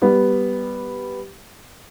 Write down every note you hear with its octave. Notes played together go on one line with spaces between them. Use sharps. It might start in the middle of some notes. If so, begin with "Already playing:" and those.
G3 B3